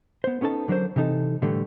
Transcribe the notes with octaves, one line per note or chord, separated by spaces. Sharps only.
B3 C5
B3 C#4 D#4 A4 A5
D3 F#3 D4 A#4 C5
C3 E3 D#4 A4
A2 D3 E3 G3 A3